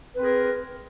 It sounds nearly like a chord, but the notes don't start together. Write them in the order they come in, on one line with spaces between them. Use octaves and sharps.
B4 C4 G#4 A#4